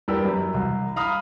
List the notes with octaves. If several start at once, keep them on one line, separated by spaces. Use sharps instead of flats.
G2 D4 G4 A#4 B4 E6
F#2
C2
F5 A#5 B5 D#6 F6